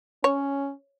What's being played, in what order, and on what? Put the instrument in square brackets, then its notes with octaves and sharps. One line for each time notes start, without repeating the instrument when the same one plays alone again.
[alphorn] C#4 [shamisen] C#5